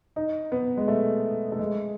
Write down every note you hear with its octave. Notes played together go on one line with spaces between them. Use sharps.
D#4
B3
G#3
A3
A3
G#3